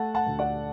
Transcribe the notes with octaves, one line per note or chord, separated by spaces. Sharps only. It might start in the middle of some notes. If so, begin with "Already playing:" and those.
Already playing: A3 F#5 A5
F#5 A5
D2
D5 F#5